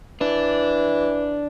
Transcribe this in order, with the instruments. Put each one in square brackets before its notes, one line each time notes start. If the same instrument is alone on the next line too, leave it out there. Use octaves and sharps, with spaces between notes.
[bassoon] E3 [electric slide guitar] D4